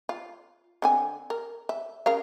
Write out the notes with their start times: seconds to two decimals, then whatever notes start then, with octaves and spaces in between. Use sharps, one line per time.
0.09 F4
0.82 D3 C4 G#5
1.30 A#4
1.69 E5
2.06 C#3 A#4 F5